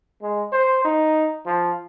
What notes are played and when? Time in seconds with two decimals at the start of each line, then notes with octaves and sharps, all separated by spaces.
0.22 G#3
0.52 C5
0.85 D#4
1.46 F3